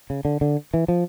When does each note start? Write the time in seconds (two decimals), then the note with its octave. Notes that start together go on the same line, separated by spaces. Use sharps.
0.10 C#3
0.25 D3
0.41 D3
0.74 E3
0.88 F3